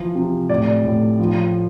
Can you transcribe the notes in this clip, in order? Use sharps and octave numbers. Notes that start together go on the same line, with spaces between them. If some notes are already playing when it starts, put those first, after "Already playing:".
Already playing: E3 F3
C3
A2 D5
A2
F3